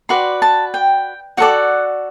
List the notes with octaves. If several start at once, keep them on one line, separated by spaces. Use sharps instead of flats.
F#4 B4 D5 C6
A5
G5
F#4 A4 D5 F#5